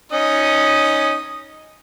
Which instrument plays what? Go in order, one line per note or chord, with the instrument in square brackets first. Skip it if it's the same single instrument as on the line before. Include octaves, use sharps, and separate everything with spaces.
[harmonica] C#4 D#4 [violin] D#6